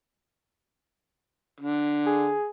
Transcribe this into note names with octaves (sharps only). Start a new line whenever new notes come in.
D3
G#4